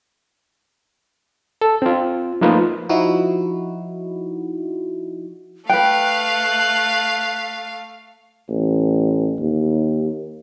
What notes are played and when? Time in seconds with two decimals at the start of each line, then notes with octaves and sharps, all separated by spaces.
1.61 A4
1.82 C4 F4
2.41 F3 A3 A#3 D#4 F4 B4
2.89 F3 D#4 E4 F#4
5.69 A3 B4 F5 G5 F#6
8.49 A1
9.40 D#2